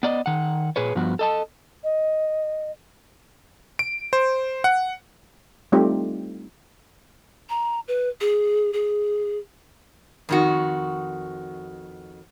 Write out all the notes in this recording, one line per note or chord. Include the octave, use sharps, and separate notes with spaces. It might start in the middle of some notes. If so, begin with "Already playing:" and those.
B3 D5 D#5
D#3 F#5
A#2 G#4 B4 C#5
G2 F3 B3 F#4
A4 D#5 A5
D#5
D7
C5
F#5
G3 A3 C4 D#4 F4 G4
A#5
B4
G#4
G#4
F2 D#3 F#4